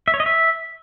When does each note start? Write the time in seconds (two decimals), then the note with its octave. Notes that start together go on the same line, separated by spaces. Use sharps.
0.08 E5
0.14 C#5
0.20 D#5
0.26 E5